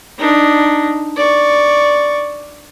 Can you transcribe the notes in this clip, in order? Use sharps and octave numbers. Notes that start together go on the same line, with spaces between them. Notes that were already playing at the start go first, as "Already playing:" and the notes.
D4 D#4
D5 C#6